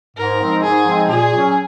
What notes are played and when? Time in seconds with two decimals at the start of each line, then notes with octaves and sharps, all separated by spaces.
0.17 G#2 A#4
0.40 F3 G#3 C4 D#4
0.63 G#2 G#4
0.87 F3 G#3 C4 D#4
1.09 A#2 G#4
1.33 F#3 C#4